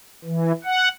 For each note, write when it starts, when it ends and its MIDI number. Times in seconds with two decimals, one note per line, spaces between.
0.25 0.52 52
0.64 0.89 78